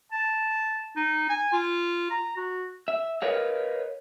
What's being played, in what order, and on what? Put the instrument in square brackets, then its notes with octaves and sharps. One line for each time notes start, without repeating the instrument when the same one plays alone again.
[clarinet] A5
D#4
G#5
F4
A#5
F#4
[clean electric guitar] E5
A#4 B4 C#5 D#5 F5